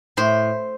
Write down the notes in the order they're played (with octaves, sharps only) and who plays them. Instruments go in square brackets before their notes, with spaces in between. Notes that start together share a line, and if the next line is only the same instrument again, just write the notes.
[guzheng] A2 C5